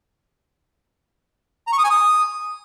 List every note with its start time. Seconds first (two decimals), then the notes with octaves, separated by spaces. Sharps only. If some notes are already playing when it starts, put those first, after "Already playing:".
1.67 A#5
1.73 C#6
1.78 D#6
1.84 G#5
1.90 D#6